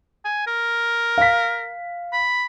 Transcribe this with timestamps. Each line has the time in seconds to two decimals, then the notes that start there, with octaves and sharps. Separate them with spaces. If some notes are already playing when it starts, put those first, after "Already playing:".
0.25 G#5
0.47 A#4
1.18 F5 B6
2.13 B5